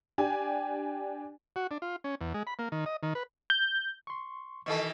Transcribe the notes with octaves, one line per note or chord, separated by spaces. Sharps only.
D4 G4 G#5
F#4
D4
F4
C#4
E2
G#3
B5
A#3
D#3
D#5
D#3
B4
G6
C6 C#6
B2 D#3 E3 A4 D#5 C#6